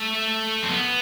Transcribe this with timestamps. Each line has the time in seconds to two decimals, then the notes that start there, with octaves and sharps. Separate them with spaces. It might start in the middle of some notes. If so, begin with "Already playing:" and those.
Already playing: A3
0.63 C4
0.70 B3